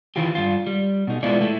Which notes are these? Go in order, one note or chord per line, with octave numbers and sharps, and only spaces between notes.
D#3 E3 F4 G4
G2 F4
G3
B2 D#4
G#3 B3 D4 E4 F4 D5
A3 E4